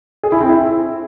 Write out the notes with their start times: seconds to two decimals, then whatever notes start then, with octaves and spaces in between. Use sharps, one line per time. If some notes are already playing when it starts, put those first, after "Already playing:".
0.23 G#4
0.32 E4
0.41 C4
0.49 E4